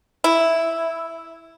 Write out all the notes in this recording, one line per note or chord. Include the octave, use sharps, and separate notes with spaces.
E4